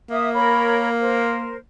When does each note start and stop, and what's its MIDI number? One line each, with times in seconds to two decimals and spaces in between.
0.10 1.60 58
0.10 0.32 76
0.10 0.32 87
0.33 0.88 70
0.33 0.88 73
0.33 0.88 83
0.99 1.56 70
0.99 1.56 72